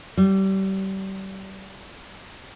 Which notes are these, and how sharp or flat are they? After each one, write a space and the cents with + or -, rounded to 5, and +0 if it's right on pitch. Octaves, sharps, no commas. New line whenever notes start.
G3 -30